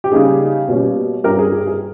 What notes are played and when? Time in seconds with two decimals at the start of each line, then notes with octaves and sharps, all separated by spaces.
0.04 G4
0.12 C#3 G3 A#3 D#4 G#4
0.68 B2 G3 A#3 C#4
1.24 G2 G3 C#4 G4 A#4
1.39 G#4
1.52 G#4
1.67 G#4